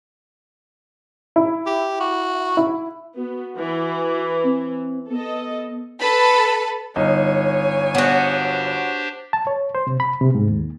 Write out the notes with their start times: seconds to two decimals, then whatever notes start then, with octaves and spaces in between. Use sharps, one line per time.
1.36 E4
1.66 G4
2.00 F#4
2.57 E4
3.16 B3 F#4
3.56 E3
4.44 C4
5.10 B3 A4 D#5
5.98 A4 B4 A5 B5
6.96 G1 D#4 C#5 G#5
7.95 B3 D4 F#4 G4 C5
9.33 A5
9.47 C#5
9.75 C5
9.87 C3
10.00 B5
10.21 C3
10.35 G#2
10.49 D#2